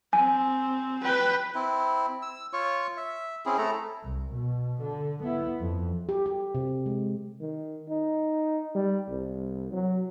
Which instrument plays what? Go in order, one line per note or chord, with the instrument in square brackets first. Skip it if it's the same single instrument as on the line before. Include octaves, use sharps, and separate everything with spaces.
[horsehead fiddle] C4 [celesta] G#5
[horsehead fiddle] B4 G5
[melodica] C4 E4
E6
F4 C#5 C#6
E5
C4 C#4 E4 G#4
A3 E4 A4 A#5
[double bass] C2
B2
D3
B3 E4
F2
[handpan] G4
G4
C3
G#3
[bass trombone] D#3
D#4
G3
C2
F#3